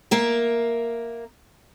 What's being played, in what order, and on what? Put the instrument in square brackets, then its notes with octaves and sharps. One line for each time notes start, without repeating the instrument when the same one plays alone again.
[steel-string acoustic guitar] A#3 A#4 E5